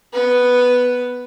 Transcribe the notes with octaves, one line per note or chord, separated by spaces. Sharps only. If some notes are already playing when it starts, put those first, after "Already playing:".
B3 B4